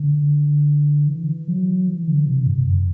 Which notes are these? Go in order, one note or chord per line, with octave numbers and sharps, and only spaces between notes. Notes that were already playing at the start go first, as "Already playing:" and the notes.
Already playing: D3
E3
F#3
E3
D3
C3
G2
F#2